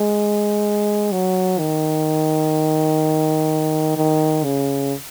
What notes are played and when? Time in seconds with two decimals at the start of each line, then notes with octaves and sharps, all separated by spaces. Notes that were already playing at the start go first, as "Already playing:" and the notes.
Already playing: G#3
1.12 F#3
1.59 D#3
3.96 D#3
4.44 C#3